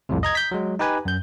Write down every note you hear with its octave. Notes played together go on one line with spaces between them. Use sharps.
C2 F2 A2 C3
D#5 A#5 G#6
G6 B6
F#3 G#3
D#4 G4 B4 G#5
F#2 G6